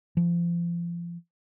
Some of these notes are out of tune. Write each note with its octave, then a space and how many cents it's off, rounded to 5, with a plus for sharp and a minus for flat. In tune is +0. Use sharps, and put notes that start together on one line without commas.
F3 -30